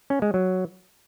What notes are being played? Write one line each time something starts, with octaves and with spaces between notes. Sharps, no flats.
C#4
G#3
F#3